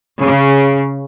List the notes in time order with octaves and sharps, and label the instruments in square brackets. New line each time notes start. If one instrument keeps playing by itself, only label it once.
[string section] C#3